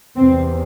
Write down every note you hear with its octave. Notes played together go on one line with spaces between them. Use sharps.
E2 C3 C4